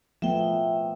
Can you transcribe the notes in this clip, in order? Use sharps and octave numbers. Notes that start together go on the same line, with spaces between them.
F3 A3 B3 E5 G5